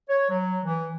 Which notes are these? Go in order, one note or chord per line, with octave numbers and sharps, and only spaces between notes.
C#5
F#3
E3